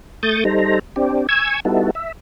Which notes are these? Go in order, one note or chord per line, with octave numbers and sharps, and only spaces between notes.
A3 C#6 D#6 G6 A6
G3 D#4 A4 C5 A#5
C4 D4 G4
G#5 C#6 E6 G#6
G3 B3 D#4 E4 F#4 A4
E5